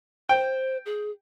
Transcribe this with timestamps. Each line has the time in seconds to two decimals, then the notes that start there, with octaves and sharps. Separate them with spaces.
0.29 C5 G5
0.86 G#4